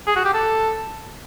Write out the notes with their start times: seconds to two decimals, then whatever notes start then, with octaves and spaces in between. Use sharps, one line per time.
0.07 G#4
0.16 F#4
0.25 G4
0.34 A4